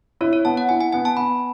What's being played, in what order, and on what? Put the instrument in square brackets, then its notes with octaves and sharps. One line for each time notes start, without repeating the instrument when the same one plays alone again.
[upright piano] E4 [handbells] C#5
[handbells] C#5
[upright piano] B3 [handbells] A5
[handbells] F#5
[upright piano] E4 [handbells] G#5
[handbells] G#5
[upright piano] B3 [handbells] G#5
[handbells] A5
[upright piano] B3 [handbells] B5